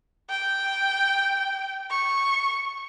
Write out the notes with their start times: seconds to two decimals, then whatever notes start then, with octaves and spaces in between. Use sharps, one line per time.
0.30 G5
1.90 C#6